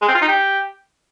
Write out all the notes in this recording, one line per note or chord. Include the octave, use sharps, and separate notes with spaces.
G#3
C4
F4
D#4
G4